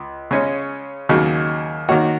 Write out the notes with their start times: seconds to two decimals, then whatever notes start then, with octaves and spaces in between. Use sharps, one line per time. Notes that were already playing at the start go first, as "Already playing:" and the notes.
Already playing: C#2
0.31 C#3 G#3 C#4
1.09 D#2 C#3 F#3
1.89 D#3 A#3 F#4 C#5